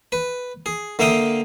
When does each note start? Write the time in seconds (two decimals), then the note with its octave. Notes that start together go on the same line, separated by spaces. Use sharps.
0.12 B4
0.66 G#4
0.99 D3 A#3 E5 F5 G5 D#6